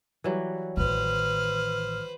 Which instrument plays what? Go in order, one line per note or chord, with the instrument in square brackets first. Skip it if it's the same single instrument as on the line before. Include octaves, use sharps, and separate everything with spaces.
[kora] E3 F#3 G3
[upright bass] A1 D#3 [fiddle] B4 C5 [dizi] F6